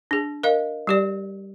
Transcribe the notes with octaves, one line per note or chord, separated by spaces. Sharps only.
D4 G#4
A#4 D#5 F5
G3 G4 D5